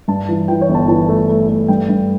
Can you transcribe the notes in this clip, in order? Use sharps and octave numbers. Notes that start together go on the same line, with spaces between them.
G2 A5
E3
E3 G5
C#5
G1
A5
E3 A5
A3
A3
A3
G2 G5
G2